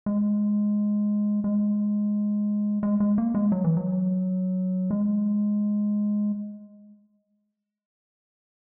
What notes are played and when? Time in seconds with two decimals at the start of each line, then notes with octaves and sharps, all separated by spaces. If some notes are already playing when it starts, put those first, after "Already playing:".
0.06 G#3
1.44 G#3
2.83 G#3
3.00 G#3
3.18 A#3
3.35 G#3
3.52 F#3
3.64 E3
3.77 F#3
4.91 G#3